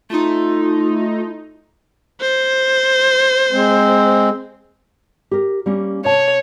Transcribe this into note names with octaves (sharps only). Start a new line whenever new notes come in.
A3 D#4 F4
C5
G#3 C4
G4 A#4
G3 A#3 C#4
C3 C#5 A5